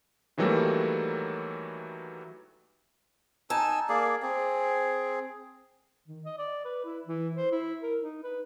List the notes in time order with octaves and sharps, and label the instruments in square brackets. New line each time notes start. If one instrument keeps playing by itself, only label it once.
[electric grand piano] D#3 E3 F#3 G3 A3 A#3
[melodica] D#4 G#5 E6 [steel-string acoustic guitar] A5
[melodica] A#3 G#4 D5
C4 G#4
[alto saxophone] D#3
D#5
D5
B4
E4
E3
C5
E4
A#4
D#4
B4